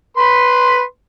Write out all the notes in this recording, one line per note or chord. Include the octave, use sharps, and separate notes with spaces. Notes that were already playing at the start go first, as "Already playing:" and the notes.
B4 B5 C6